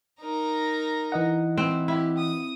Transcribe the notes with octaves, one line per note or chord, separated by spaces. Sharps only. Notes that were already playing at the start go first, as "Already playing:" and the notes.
D#4 A#4
E3 D#5 F#5
C4 E4
E4 G4
D#6